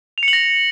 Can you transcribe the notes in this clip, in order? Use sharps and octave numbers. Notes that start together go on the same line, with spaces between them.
F7
C#7
F#7
A#6